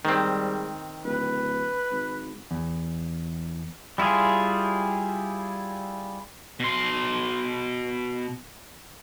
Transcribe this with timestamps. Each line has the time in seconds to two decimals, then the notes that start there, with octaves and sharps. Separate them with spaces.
0.05 G#2 D#3 G3 C4
1.04 D1 B4
1.91 G#1
2.51 E2
3.98 G3 E4 F4 G#4
6.60 B2 C6